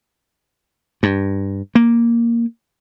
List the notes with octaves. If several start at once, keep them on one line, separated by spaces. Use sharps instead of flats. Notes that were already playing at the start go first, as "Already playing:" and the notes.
G2
A#3